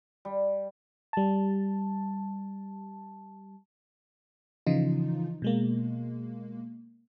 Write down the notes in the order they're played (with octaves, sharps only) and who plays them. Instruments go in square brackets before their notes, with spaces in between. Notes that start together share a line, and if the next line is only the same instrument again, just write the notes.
[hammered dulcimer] G3
[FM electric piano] G3 A5
C#3 E3 F3 D#4 F4
B2 G#3 A#3